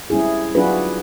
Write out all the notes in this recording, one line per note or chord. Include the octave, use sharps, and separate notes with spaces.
G3 C4 C#4 E4 G#4
F#3 D4 F4 F#4 G#4 B4